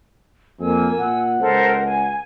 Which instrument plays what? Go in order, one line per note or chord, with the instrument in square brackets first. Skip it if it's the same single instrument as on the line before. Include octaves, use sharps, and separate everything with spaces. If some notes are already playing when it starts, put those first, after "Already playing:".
[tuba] F2 [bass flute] A#3 [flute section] G#5 E6
[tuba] A#2 [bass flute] F#5
[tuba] C#2 [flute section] A4 A#4 C5
[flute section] G#5